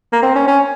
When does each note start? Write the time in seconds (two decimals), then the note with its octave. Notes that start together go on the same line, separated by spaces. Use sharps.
0.13 A#3
0.23 C4
0.36 C#4
0.48 C#4